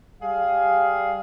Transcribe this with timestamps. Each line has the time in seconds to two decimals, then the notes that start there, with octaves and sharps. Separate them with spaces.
0.22 G3 G#4 F5